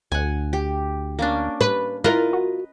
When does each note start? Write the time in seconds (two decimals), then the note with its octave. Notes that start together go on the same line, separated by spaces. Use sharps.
0.12 D2 F#5 G#5
0.53 G4
1.19 A#3 C#4 D4
1.61 B4
2.04 E4 F4 A#4 B4 D#5 A#5
2.33 F#4